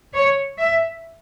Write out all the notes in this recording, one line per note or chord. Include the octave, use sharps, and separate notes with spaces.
C#5
E5